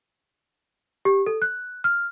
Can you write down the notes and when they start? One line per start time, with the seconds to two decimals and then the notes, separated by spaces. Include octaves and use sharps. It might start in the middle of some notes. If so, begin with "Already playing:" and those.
1.05 G4
1.26 A4
1.42 F#6
1.84 F6